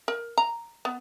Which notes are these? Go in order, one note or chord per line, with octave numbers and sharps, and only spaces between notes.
A#4
A#5
B3